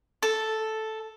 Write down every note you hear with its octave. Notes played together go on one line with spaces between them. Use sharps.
A4